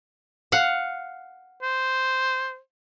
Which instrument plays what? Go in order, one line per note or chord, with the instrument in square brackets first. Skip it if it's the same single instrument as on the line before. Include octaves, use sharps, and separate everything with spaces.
[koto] F5 F#5
[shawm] C5